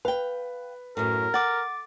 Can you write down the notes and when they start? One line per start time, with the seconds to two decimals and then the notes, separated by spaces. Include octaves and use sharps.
0.05 B4 F5 G5
0.97 F#2 A2 A#4
1.34 F#5 D6 A6